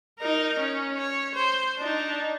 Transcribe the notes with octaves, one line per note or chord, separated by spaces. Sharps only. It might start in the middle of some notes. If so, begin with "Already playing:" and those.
D#4 A#4
C#4
C#5
C5
D4 D#4